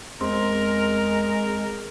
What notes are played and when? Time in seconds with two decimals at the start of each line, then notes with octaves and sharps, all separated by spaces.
0.21 E2 G#3 C4 A#4